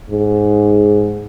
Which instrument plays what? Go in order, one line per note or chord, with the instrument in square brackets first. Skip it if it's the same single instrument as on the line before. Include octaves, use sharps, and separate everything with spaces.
[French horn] G#2